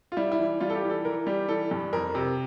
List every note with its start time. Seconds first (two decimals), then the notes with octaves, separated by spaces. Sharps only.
0.12 F4
0.17 G3 E4
0.32 E4
0.39 E3
0.60 G3 F4
0.70 A4
0.75 G4
0.83 E3
0.90 A4
1.05 E3 A#4
1.27 G3 G4
1.49 E3 A4
1.71 G2
1.93 F2 A#4
2.15 C3